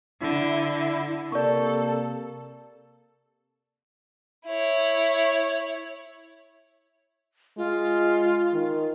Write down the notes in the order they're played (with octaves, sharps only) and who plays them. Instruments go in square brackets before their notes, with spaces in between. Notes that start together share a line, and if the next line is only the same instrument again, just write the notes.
[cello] D3 [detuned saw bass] E4
[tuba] C3 [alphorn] A#3 [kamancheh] A4 [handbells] D5 C#6
[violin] E4 C#5
[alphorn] G#3 [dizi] F4
[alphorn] D#3